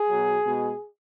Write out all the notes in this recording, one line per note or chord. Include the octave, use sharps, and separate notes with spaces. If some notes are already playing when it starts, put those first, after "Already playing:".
Already playing: G#4
B2 F#3
B2 G#3